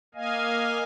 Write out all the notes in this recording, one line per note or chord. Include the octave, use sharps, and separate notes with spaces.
A#3 D#5 F5 G#5